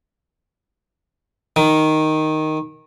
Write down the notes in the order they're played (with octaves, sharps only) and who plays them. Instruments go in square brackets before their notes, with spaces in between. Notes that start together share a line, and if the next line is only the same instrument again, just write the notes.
[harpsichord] D#3